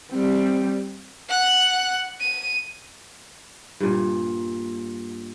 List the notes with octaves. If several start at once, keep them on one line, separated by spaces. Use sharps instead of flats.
G3 C4
F#5 F#6
D#7
G2 A#2